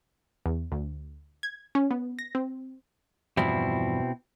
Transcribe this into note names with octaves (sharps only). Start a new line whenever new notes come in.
E2
D2
G#6
C#4
B3
A#6
C4
E2 G2 B2 F3 C4 E4